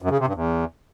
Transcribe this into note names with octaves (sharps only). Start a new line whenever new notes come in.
F#2
C#3
C3
G2
E2